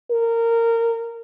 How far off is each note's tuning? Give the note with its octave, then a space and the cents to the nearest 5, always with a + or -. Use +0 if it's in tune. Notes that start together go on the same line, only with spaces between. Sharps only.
A#4 -20